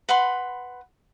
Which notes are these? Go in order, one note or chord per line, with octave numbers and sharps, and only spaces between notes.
B4 F#5 B5 C6